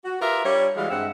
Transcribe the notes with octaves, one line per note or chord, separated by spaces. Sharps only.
F#4
F4 G4 A#4 B4 E5
G3 D4 C#5
E3 G3 G#3 F#4 F5
G2 G#3 C4 E5 F#5